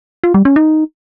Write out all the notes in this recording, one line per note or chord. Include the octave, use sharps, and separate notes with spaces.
F4
G3
C#4
D#4